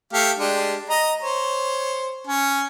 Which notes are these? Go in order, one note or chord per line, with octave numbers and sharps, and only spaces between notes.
A3 G4 F5
G#3 D4 G4
D#5 A#5
C5 C#5
C#4